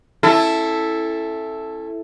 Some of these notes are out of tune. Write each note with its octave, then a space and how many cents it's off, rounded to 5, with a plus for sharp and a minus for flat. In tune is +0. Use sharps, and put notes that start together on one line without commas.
C#4 -35 E4 +0 A4 +0